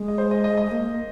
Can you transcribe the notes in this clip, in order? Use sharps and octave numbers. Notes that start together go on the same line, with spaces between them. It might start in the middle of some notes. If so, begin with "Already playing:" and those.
Already playing: G#3
D#5
C5
D#5
D#5
D#5
G#3
A#3